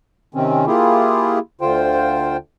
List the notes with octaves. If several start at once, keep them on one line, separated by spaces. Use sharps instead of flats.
C3 D#3 C4 C#4
A#3 E4 F4 G4 G#4
D2 D3 F4 C5 G5